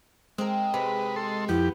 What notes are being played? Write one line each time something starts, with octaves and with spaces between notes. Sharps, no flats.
G#3 C4 A#4
C3 B4
A4 C6
F2 B3 E4 G4